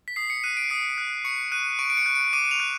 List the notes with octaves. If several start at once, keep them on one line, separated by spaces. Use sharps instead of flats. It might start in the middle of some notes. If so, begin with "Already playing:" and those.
B6
D#6 C7
C#7
F#6 D#7
D7
D#6 C7
F#6
C#6 C#7
F#6 D#7
C#6 D7
D7
C#7
F#6
D7
D6 D#7
F7
F#6